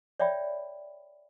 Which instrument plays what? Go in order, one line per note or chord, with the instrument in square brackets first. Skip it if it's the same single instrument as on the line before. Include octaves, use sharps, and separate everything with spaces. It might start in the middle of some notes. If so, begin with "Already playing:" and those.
[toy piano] C#5 D5 E5 G5 B5